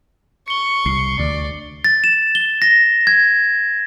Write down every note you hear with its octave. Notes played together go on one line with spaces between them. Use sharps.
C#6 C#7 G7
C2 C7 C#7 G7
D2 D5
A6
E7
G7
A#6
G#6